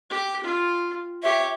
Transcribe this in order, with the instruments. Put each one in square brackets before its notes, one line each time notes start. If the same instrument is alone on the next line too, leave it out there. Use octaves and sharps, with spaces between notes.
[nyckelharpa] G4
F4
[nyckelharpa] G4 C#5 [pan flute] E5